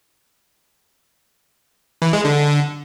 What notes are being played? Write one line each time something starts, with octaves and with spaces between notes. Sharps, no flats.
E3
G#3
D3